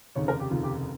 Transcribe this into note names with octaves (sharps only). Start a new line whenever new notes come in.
F1 D#2 C#3 C#5
A#4
G4
F1 D#2 C#3 F4
G4